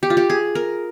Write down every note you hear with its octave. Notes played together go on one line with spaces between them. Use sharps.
G4
F4
G4
G#4
A#4